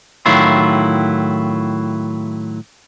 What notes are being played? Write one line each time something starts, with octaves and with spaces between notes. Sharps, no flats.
A2 D#3 F#3 E4 F4